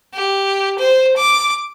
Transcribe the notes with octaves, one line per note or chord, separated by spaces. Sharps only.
G4
C5
D6